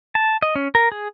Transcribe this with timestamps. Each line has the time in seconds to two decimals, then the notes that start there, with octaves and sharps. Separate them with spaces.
0.15 A5
0.42 D#5
0.55 C#4
0.75 A#4
0.92 G#4